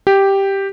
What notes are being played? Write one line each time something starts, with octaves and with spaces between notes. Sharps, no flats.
G4